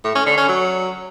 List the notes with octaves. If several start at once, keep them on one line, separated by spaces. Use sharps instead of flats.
A2
C#4
D3
C#4
F#3